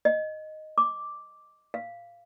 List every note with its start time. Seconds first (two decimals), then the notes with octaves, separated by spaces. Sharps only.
0.05 D#5
0.78 D6
1.74 F5